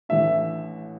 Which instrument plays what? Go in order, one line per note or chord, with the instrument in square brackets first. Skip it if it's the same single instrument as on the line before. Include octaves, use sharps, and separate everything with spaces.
[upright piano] A1 A2 E3 A3 D4 [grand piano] E5